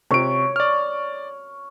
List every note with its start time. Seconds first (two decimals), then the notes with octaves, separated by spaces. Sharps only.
0.11 C3 C#5 D7
0.56 D5 F6